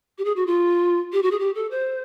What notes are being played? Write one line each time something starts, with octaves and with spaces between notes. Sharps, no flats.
G4
G#4
F#4
F4
G4
F#4
G#4
G4
A4
C5